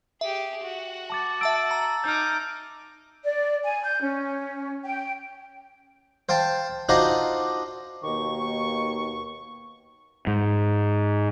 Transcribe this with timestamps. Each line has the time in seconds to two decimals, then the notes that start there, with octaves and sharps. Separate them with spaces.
0.21 G4 G#4 E5
0.64 F#4 F#5
1.10 A5 D6 A6
1.41 E5 A5 E6 A6 D7
1.71 A#5
2.04 D#4 D6 F6 G6
3.24 D5
3.64 G#5
3.84 G6
4.01 C#4
4.84 G5
6.29 C5 F5 G5 A5
6.89 D4 D#4 F4 F#4 C5 D#5
8.02 D#2 B2 D#3 A#3 C#6
10.27 G#2